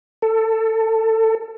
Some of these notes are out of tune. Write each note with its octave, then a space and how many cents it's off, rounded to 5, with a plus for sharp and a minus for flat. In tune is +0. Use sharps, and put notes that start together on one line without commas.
A4 +20